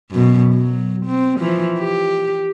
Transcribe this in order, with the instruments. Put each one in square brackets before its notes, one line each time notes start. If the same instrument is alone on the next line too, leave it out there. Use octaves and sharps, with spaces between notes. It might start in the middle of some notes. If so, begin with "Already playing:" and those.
[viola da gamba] F#2 B2
F#3
C4
E3 F3
G4